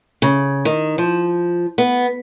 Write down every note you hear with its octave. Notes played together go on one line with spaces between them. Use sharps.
C#3
D#3
F3
B3